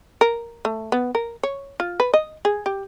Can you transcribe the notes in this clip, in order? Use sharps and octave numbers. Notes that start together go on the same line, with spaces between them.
A#4
A3
B3
A#4
C#5
F4
B4
D#5
G#4
G4